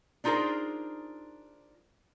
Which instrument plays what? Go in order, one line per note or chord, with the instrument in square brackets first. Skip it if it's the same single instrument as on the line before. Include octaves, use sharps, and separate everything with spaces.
[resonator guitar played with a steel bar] D4 D#4 F4 G#4 A#4 C5